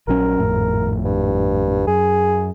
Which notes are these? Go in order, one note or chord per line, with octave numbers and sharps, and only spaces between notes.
A#1 F#3 C#4 A#4
G#1 F2 A2
G2
F#2 G#4